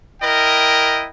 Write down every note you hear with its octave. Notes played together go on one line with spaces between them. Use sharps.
E4 A#4 D#5 G5